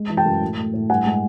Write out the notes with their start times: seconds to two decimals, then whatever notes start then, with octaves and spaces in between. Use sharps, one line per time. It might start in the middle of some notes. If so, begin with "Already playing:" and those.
Already playing: G#3
0.10 E3
0.17 G5 A5
0.26 F#2
0.41 A2
0.58 A3
0.74 A2
0.90 G2 F#5 G#5
1.06 G#3